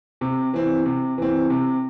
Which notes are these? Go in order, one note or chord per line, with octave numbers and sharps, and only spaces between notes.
C3
E3 C4
C3
E3 C4
C3